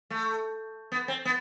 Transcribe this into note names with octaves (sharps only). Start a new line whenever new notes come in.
A3
B3
C4
B3